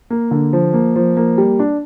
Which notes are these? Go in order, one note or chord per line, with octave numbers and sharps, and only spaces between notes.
A#3
D3
F3
A#3
F3
A#3
G3
D4